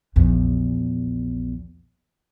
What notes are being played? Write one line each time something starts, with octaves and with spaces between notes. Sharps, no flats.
A#1 E2